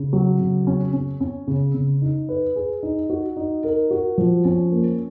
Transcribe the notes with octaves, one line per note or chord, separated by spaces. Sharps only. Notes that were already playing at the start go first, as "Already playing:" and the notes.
Already playing: C#3
F#3
C#3
C#4
C#4
C#4
C#3
C#3
D#4
B4
G#4
D#4
F#4
D#4
A#4
F#4
F3
C#4
A#3